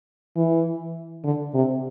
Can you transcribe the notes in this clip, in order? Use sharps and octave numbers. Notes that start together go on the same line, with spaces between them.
E3
D3
C3